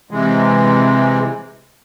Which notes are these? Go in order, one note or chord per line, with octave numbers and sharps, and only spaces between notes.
C3 E3 G#3